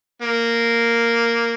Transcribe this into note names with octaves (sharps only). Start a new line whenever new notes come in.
A#3